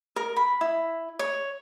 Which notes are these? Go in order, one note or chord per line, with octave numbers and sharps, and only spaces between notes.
A#4
B5
E4
C#5